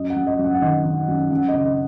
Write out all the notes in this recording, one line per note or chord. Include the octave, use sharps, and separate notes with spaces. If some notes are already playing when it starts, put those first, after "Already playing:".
Already playing: F#2 D#5
F#5
F#2
D#5
F#2
F#5
F#5
D#3 D#5
D#3
F#2
F#2 F#5
C#3 D#5
D#5